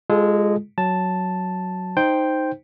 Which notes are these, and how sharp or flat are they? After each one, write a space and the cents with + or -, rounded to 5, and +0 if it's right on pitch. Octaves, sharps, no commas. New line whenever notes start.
G#3 -10 F4 +0 A4 -35
F#3 +0 A5 +0
D#4 +0 C5 +0 G5 +0